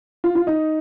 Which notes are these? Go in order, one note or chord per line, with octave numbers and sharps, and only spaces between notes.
F4
F4
D#4